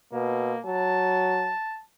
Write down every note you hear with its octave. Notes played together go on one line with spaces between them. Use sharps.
B2 A#3
F#3 A5